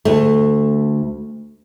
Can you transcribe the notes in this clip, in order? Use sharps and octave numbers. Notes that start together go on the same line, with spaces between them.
D2 A3